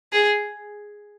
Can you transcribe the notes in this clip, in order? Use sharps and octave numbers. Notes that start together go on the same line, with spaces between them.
G#4